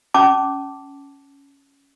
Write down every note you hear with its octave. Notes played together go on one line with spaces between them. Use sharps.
C#4 A5 D6